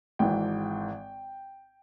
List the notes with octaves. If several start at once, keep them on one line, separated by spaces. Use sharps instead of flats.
G#1 G#2 E3 G5